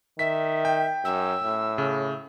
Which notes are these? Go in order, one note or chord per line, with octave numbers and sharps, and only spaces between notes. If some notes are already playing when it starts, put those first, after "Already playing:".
D#3 E5 B6
G5
F#2 E6
A2
C#3